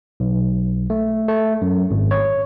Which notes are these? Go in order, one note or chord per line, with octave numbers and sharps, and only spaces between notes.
B1
A3
A3
F#2
G#1
C#5